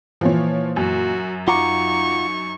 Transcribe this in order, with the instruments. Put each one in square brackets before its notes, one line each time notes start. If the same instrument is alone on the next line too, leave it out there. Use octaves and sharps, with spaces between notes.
[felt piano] A#2 E3 [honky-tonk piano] F3 C#5
[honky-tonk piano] F#2 [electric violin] F#4
[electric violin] D#4 C#6 [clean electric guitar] F4 F#5 A#5 [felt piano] D6